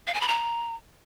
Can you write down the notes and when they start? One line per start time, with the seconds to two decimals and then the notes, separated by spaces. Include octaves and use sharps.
0.07 F5
0.14 G#5
0.21 B5
0.28 A#5